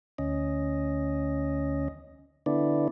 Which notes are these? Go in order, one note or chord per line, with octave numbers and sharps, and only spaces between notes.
D2 C#4 D#5
D3 B3 D4 E4 D5